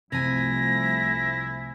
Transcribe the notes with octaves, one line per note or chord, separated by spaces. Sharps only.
C2 C3 F3 A3 E4 G#5 A#6